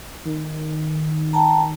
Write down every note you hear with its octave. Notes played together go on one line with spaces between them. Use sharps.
D#3
G5 A5 A#5